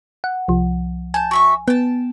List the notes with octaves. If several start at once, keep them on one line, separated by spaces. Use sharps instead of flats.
F#5
C2 F3
G#5 A5 G6
F#4 E5 C#6
B3 G5 A5